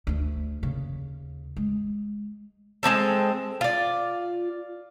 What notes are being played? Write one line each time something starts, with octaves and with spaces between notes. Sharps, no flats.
D2 D4
D#2 C#3
G#3
G#3 A#3 C4 A4
F4 D5